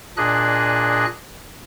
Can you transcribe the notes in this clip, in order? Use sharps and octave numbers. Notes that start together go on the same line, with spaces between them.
A#2 D4 G#4 D#5 F#6